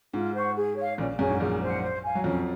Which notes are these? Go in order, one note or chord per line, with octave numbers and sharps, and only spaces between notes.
G#2 F4
C5 F#5 C#6
G#4
C#5 F5
A#1 A#2 C#4
F#2 G#4 C#5 G#5
G#2
A#1 A#2 G#4
C5 F#5
C5
F5 G#5
F#3
F2 F3 C#4